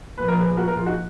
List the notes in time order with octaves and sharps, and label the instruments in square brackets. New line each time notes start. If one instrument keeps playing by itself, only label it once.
[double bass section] A#2 F3 A#3 [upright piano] B4
[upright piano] A#4
G#4 B4
F#4 A#4
A#4
F4 G#4
D#4 F#4